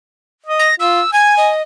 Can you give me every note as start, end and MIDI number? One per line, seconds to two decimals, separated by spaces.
0.46 0.69 75
0.59 0.75 94
0.80 1.01 65
0.80 1.13 88
1.13 1.50 80
1.13 1.34 92
1.37 1.62 75